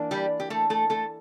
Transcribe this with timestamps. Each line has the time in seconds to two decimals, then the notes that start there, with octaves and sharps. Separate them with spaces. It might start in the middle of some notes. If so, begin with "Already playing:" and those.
Already playing: E3 A#3 D4
0.11 G3 G4
0.40 G4
0.50 A3 A4
0.70 A3 A4
0.90 A3 A4